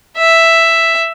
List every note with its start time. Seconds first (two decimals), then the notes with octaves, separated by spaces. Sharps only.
0.18 E5